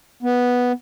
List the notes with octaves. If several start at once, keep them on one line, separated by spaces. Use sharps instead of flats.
B3